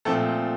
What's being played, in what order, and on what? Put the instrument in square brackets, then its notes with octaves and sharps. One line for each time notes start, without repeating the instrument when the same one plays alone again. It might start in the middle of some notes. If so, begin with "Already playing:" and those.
[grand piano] A#2 F3 A3 C4 A4